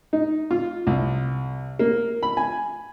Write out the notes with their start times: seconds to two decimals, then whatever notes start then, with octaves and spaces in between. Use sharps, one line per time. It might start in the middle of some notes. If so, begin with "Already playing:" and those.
0.13 D#4
0.51 F4
0.87 C2
1.79 A#3
2.23 B5
2.37 G#5